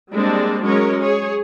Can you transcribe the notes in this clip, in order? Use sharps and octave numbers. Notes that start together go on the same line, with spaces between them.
G3 G#3 A#3 C4 D4
F#3 G#3 C#4 A#4 C#5
G#4 C#5